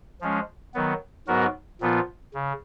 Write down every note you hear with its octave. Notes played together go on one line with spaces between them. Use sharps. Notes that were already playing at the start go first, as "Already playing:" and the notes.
F3 G#3 C#4
D#3 F#3 B3
G#2 F#3 B3 F#4 A#4
A#2 F3 B3 F4
C#3